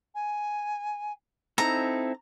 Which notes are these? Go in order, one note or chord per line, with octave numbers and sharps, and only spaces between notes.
G#5
C4 D#4 E4 A4 A#5